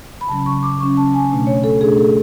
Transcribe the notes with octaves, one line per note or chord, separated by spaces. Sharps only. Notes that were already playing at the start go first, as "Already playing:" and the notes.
B5
C#3 F#3 C#4 A5
C#6
D6
C#3 F#3 C#4 C#6
A5
G#5
B2 A3 D4
C#5
A4
B2 A3 D4 G#4
A4